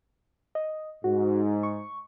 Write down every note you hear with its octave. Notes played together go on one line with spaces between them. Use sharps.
D#5
G#2 F#4
C#6